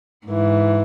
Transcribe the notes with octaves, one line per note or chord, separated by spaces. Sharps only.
G#2 E3